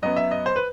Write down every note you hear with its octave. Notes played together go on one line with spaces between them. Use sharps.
F#2 F#3 B3 D#5
E5
D#5
C5
B4